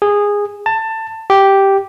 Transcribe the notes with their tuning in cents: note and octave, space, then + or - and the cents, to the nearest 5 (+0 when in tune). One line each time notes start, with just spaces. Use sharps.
G#4 -15
A5 +20
G4 -5